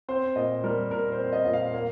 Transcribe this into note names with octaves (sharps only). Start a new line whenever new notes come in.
C4 C5
A#2 D#5
G3 A#4
A#2 A#4
C5
C4
D#5
A#2 D#5
F5
A#3 F5